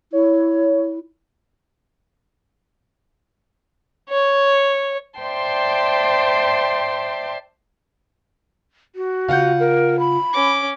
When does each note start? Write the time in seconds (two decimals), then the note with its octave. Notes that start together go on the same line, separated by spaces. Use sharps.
0.13 E4 C#5
4.10 C#5
5.20 C5 D5 E5 G5 A5 C6
8.96 F#4
9.28 C#3 F4 F5 F#5 G6
9.60 A#4
9.99 B5
10.33 C#4 D6